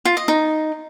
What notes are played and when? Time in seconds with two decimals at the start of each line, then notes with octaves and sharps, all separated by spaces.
0.05 F4
0.17 D#5
0.28 D#4